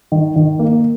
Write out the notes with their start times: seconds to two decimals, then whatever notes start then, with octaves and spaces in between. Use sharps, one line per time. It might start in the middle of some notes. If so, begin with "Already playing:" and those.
0.12 D#3
0.36 D#3
0.59 A#3